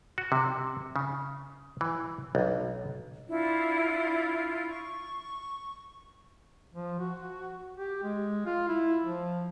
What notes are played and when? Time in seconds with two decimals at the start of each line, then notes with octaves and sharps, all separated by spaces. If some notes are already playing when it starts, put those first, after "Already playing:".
0.18 F#4
0.32 C3
0.96 C#3
1.81 E3
2.35 B1
3.27 D4 E4 F4
4.68 C#6
6.73 F3
7.00 F#4
7.76 G4
8.03 G#3
8.46 F4
8.68 E4
9.04 F3